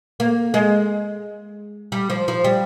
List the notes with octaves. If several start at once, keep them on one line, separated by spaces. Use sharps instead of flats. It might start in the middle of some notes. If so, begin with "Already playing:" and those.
A#3
G#3
G3
F3
F3
G3